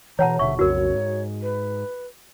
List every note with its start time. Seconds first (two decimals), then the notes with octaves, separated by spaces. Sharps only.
0.19 B2 E3 C#5 F#5 A5 A#5
0.39 D#1 B2 D3 E5 C#6
0.59 B1 F2 C#3 F#4 A#4 C#5
0.93 G#2
1.42 B4